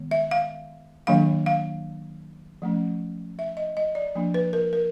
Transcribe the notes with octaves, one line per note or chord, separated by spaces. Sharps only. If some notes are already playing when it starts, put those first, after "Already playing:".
Already playing: D#3 G#3 B3
E5
F5
D#3 F#3 A#3 D4 F5
F5
F3 A3 C#4
E5
D#5
D#5
D5
F3 A#3 D4
B4
A#4
A#4